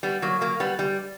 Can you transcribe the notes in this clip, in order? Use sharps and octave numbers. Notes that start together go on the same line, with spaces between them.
G3 B3
F#3 A#3
F#3 A#3
G3 B3
G3